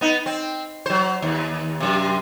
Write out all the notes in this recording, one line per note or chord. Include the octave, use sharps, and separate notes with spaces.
B3 D#4
C4
F#3 C5
D#2
F#2 C3